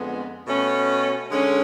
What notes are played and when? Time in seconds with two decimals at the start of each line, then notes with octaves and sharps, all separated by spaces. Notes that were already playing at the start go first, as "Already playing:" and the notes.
Already playing: F2 D3 G#3 B3
0.46 B2 A3 C#4
1.31 D3 G#3 C#4